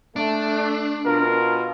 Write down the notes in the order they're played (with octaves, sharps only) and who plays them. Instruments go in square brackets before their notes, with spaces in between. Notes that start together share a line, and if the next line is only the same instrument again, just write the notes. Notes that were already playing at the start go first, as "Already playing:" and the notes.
[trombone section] A3 [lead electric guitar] D4
[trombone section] B2 F4 [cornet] A#4